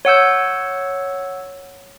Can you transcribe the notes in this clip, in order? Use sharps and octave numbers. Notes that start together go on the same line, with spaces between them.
C#5 F#5 E6 G6